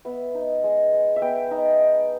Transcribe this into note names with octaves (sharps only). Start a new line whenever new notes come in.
B3 E5
D#4
G#3
G#3
E5
B3 G5
D#4